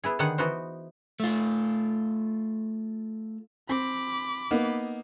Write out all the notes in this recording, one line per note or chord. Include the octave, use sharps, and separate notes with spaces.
B3 E4 G#4
D3 D#3 B3 D#4 G#4 F#5
E3 B3 D#4 F#4 C5
A3 F4
C4 B5 D6
A#3 B3 D#4